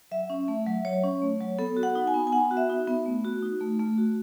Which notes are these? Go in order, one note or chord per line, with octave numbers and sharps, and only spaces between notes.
F#3 E5
C#4
A3
F#3
F#3 C#5
C#4
A3
F#3
B3 A4
F#4
F#5
D#4
G#5
B3
G#5
B3 F#5
F#4
E5
D#4
B3
A3
F#4
D#4
A3
A3
F#4